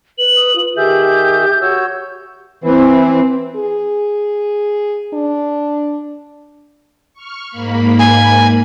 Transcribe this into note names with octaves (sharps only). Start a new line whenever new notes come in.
B4 F#7
D#6
F4
D#3 G4 G#4 E5 G6
F#4 C#5 E6
E3 C4
G#4
D4
C#6 F6
G#2 A#3 B5
G#5